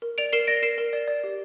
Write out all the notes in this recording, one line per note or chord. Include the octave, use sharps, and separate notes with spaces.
A#4
D5 D7 F7
A#4 C7 E7
D5 A#6 D7
A#4 C7 E7
A#4
D5
D5
G4